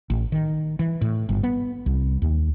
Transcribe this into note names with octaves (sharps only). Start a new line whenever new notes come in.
A1
D#3
E3
A2
G1
B3
C2
D#2